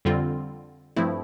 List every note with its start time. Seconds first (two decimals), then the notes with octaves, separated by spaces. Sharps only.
0.05 F2 D3 G3 C4 F4
0.96 G2 F3 A3 C4 E4